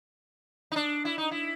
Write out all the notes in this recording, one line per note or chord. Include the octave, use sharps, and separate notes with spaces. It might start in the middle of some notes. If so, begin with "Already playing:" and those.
D#4
D4
E4
D#4
E4